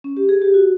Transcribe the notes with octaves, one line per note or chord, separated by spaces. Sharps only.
C#4
G4
G#4
G4
F#4